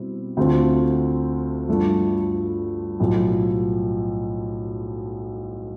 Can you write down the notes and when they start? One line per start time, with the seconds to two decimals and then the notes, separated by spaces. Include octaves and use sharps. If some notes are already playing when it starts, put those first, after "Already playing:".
Already playing: B2 G3 C4 E4
0.37 D2 D3 A3 C4 F4
1.69 G2 F3 A3 D4
3.00 B1 A2 F3